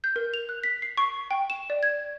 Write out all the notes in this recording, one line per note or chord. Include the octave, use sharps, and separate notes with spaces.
G6
A#4
F7
F#6
B6
C7
C#6
G5
E7
D5
G#6